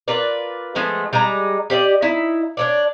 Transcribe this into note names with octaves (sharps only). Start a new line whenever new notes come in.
F4 A#4 B4 D5
F3 G#3 A3 B3
G3 G#3 D#4 A#5
G4 C5 D5 D#5
D#4 E4 E5
D4 C#5 D5